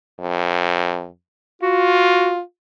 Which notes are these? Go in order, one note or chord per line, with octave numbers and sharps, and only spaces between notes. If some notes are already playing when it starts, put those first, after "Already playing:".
F2
F4 F#4